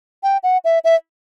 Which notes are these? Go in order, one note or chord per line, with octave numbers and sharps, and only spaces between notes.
G5
F#5
E5
E5